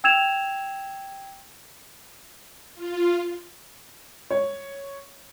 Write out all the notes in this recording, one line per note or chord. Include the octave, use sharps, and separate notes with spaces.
G5 E6 G#6 E7 F7
F4
C#5